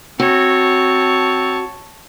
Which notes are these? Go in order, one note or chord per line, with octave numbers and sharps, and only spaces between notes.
C4 F#4 C#5 A5